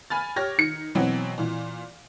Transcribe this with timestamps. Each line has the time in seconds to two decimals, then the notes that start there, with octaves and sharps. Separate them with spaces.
0.10 G#5 B5 F6 A6
0.36 G4 C#5 F6 G#6 A#6
0.58 D#3 C#7
0.95 B2 E3 F#3 B3 C4
1.38 A#2 E3